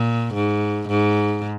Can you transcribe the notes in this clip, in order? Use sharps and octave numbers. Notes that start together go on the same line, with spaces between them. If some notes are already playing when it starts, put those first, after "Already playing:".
Already playing: A#2
G#2
G#2